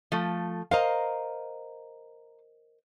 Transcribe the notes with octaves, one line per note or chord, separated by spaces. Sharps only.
F3 A3
A#4 C5 D#5 F5 A#5